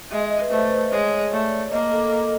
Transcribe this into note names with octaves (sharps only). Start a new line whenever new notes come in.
G#3 E5
D#5
D#5
B4
A3 C5
G#3 C#5
A3 D5
A#3 D#5
D#5
A4
A4